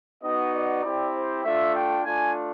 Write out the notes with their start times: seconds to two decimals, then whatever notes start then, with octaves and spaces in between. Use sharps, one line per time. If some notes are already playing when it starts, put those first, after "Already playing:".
0.22 B3 D#4 F#4 D#5
0.52 D5
0.83 C4 E4 G4
1.13 C5
1.44 A3 D4 F4 E5
1.74 G5
2.04 A3 D4 F4 G#5